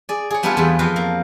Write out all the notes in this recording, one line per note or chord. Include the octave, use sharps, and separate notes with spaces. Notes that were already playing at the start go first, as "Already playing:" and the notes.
G#4 D5
G#4 C#5
G3 B3 D4 E4 F4 G#4
E2 G3 A4
F2 F3 C4 B4
A#3